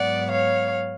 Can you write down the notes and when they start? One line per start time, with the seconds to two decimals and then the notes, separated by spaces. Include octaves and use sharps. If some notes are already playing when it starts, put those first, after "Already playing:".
Already playing: G#2 F#3 B3 D5 F#5
0.31 C#5 F5